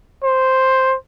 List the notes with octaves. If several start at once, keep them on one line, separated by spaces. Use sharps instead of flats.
C5